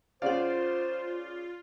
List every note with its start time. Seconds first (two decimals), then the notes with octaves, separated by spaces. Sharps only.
0.22 C#3 F4 C5 D5 F5 F#5